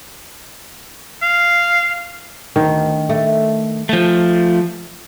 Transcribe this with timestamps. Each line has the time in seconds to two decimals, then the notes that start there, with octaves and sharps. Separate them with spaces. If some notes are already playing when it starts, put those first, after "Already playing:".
1.22 F5
2.56 D2 D#3
3.09 A3
3.89 F3 A3